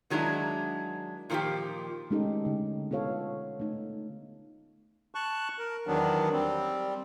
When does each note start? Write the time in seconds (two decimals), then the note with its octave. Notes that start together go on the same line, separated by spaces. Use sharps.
0.10 D#3 F#3 G#3 D4 E4
1.30 A#2 D#3 F3 A#3 F4 G4
2.11 G#3 A3 C#4 D#4 G4 A4
2.45 D3 D#4
2.91 B3 F4 A4 C#5 F5
3.60 A3 D#4
5.15 A5 C#6 F#6
5.59 A#4
5.87 E2 D#3 F#3 B3 D4
6.33 G3 C4